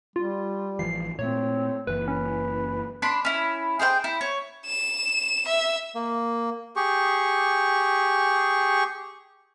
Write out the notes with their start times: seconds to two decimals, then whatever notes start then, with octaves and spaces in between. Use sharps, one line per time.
0.16 G3 F4
0.79 A1 E3 F3 C7
1.19 A#2 A3 C4 C#5
1.87 F#1 E3 B4
2.08 C#4 B4
3.02 D4 B5 C6
3.25 C#4 E4
3.79 G#4 C5 F5 G5
4.04 E4
4.21 C#5
4.66 E7
5.48 E5
5.95 A#3
6.76 G4 G#4 C#6